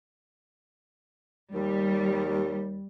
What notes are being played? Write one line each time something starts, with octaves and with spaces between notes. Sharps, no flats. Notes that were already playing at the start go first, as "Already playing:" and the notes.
D#2 G3